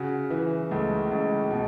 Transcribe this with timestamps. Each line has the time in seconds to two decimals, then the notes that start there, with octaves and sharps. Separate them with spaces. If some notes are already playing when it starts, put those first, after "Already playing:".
Already playing: C#3 F#4
0.30 E3 E4
0.71 C#2 A3
1.11 C#2
1.51 B2